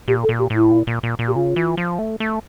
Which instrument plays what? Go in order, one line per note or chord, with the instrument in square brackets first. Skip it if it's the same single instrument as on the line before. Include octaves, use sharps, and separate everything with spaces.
[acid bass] A#2 [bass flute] G4
[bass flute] A4
[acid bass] A#2
[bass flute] G4
[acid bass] A2
[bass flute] E4
[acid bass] A#2
A#2
A#2
A#2
[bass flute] G4
[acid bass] C#3 [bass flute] F4
[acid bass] E3
F3
A3
A3